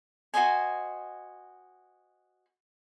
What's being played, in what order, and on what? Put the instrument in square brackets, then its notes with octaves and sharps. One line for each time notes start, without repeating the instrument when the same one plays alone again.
[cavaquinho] F#4 C5 D#5 G#5